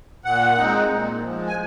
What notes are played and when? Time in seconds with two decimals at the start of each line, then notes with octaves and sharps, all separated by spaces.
0.25 A#2 F#5
0.58 G#3 C4 D#4
0.90 A#2
1.22 F3 G#3
1.47 G#5